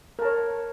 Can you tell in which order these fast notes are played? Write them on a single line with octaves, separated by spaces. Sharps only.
A#4 A5 C#5